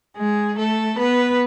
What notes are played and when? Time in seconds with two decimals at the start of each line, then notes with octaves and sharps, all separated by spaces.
0.16 G#3 G#4
0.57 A3 A4
0.98 B3 B4